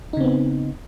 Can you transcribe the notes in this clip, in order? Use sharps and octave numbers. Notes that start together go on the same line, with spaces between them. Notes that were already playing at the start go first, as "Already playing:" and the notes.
C#3 B3 C4 D#4